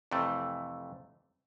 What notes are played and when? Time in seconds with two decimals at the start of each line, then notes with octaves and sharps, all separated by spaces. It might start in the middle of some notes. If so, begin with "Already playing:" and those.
0.11 F2 C3 E3 A3